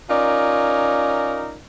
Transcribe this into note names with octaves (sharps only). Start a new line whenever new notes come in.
C#4 D#4 F4 A#4 D5